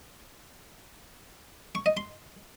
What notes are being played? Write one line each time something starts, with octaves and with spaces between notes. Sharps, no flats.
C#6
D#5
C6